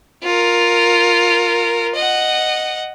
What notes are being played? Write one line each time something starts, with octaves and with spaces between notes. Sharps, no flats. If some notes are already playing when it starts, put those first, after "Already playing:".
F4 A#4
D#5 F#5